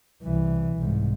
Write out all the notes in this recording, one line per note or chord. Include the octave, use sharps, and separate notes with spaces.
C2 E3
C2 G#2